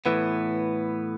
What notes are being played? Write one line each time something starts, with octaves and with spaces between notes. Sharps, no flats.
A2 E3 B3